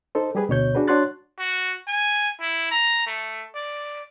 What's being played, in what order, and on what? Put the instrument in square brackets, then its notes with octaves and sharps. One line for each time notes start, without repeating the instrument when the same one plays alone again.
[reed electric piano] D#4 A4 C5
G3 G4 G#4 B4
D2 B2 C#5 G6
D4 F#4 G#4 B4
D4 F#4 C#5 C6 F#6 A6
[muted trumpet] F#4
G#5
E4
A#5
A3
D5